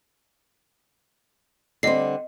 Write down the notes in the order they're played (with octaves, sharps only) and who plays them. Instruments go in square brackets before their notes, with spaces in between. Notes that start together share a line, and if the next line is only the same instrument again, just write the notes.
[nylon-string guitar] D3 G3 C4 [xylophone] D#5 C7